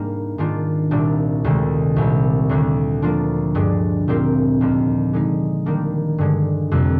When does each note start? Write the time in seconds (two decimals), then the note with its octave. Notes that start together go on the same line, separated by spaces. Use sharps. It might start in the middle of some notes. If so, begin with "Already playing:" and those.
Already playing: G#2 G3 A#3 D4
0.38 G#2 D#3 A#3 D4 F4
0.91 C2 A#2 G3 A#3 D4
1.44 D2 C3 D#3 G#3
1.96 C2 A#2 G3
2.49 D2 D3 G3
3.02 F3 A#3 D4 F4
3.55 G2 D3 G#3 D4 G#4
4.08 A#2 G#3 C4 G4 A#4
4.61 D#2 D3 F3 A#3
5.13 D3 G#3 D#4
5.66 D#3 G3 A#3 D4
6.18 G2 D3 G#3
6.71 F2 C3 G3 A#3